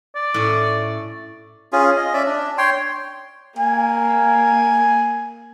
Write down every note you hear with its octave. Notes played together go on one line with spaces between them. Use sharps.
D5
A2 C#4
C#4 F4 G#4
D#5
C#4 D5 E5
D4
C#5 G5 C6
A#3 G#5